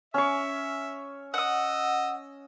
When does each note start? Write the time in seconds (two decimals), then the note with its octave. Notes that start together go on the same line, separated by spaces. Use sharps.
0.14 C#4 E5 C#6
1.34 D#5 F#5 D#6 E6